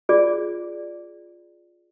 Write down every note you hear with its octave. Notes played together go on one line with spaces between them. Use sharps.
F4 G#4 D5